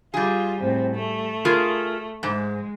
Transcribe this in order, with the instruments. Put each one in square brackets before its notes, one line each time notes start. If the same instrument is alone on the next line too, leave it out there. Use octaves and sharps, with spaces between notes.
[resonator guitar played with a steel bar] G3 G#4 [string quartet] F4
[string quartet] A2 C4
A3
[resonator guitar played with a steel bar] F4 G#4 A#4
[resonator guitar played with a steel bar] G#2 [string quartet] G#3